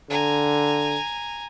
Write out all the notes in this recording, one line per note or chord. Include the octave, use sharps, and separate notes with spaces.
D3 G#5 A#5